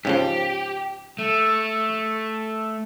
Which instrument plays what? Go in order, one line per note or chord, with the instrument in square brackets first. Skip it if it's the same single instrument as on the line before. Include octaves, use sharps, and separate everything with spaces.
[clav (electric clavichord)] G#2 C#3 F3 [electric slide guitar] G4
[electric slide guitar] A3